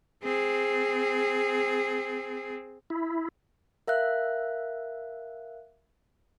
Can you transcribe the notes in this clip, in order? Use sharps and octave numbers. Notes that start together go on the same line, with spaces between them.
C4 G#4
E4
A#4 E5 F5 F#6